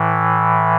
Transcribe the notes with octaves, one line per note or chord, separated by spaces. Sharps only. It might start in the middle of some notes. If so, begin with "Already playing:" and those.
Already playing: A2 E3